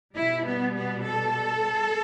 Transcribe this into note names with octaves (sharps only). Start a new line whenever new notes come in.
B2 G3 E4
B3
B3
A4